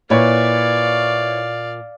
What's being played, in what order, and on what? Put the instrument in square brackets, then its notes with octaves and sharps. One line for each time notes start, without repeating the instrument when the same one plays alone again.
[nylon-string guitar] A#2 [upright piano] E4 B4 C#5 [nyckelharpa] D5 F5